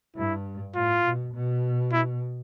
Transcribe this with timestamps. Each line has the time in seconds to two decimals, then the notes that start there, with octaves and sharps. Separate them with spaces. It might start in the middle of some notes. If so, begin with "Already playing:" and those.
0.16 G2 E4
0.75 A2 F4
1.04 B2
1.34 B2
1.92 E4